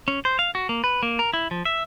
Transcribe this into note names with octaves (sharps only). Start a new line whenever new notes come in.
C#4
C5
F5
F#4
A#3
B4
A#3
A#4
E4
F3
E5